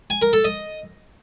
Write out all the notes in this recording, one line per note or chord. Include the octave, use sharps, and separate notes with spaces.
G#5
A#4
A4
D#5